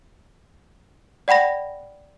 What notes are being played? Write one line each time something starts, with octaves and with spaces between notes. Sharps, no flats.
D5 F#5 G5 B5 A#6